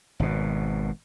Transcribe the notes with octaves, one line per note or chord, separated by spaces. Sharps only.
G#1 B2